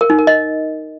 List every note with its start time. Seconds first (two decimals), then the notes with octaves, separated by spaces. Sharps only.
0.01 A#4
0.10 D#4
0.18 A#4
0.27 D#5